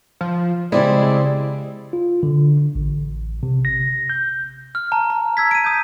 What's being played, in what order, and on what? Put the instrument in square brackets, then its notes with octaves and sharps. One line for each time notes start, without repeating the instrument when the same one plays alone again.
[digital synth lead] F3
[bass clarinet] C#3 [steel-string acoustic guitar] G3 C4 E4 [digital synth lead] G#3 [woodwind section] D5
[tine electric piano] F4
D3
A1
C3
A#6
G6
[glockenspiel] F6
A5 A#5
A#5
E6 G#6 B6
D7 D#7
D#6 G6